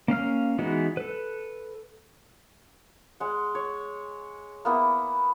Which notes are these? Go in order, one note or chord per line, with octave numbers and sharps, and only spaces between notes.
A#3 C#4 F5 F6
E3 G#3 B3 D#4 F#4
A4 B4
G#3 F#5
C#5
A#3 B3 E4